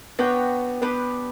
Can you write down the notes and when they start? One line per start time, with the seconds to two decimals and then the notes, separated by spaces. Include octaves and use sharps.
0.19 B3 D4 F#4 C#5 G5
0.82 B3 D4 G4 B4